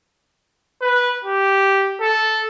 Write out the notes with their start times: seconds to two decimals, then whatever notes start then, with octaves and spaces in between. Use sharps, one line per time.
0.81 B4
1.24 G4
2.01 A4